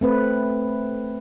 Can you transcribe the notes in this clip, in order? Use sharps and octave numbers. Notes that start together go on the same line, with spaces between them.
A3 C4 B4